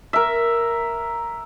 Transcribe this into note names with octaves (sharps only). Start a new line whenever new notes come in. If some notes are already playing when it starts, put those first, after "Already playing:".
A#4 E5